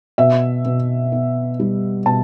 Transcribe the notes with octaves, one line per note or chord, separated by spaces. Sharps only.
B2 E5
B2
B3
G3
B2 A5